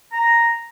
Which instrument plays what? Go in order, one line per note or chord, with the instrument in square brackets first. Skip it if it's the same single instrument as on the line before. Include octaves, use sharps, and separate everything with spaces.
[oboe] A#5